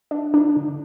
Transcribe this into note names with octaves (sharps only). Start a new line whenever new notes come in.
D4
D4
D3